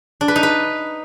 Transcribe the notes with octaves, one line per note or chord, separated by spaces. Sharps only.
D4
B4
D#4
B4